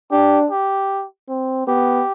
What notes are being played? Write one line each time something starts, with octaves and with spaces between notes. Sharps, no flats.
D4 G4
G4
C4
B3 G4